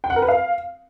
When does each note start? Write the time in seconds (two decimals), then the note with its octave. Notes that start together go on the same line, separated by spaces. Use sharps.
0.04 G5
0.10 F#5
0.16 A#4
0.22 B4
0.28 F5